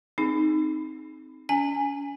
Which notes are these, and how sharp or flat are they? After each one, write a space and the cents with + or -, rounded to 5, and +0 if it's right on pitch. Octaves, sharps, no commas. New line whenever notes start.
C4 +0 D#4 +0 G#4 +20
C#4 +40 G#5 +0